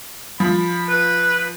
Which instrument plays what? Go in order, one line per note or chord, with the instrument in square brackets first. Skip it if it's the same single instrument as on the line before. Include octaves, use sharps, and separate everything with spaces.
[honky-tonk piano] F3 [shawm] B5
[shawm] B4